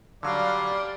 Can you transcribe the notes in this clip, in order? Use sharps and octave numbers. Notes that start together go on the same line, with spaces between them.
D3 F#3 G3 D5 F5